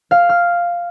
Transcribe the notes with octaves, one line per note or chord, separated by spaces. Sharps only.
F5
F6